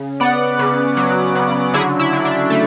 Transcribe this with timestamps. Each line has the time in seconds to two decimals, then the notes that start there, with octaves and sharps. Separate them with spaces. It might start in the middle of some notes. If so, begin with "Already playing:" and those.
Already playing: C#3
0.20 B3 D5 F#5
0.59 C#3
0.97 F#3
1.35 C#3
1.74 D3 E4 G#4
1.99 E4
2.13 D3
2.25 D4
2.50 A3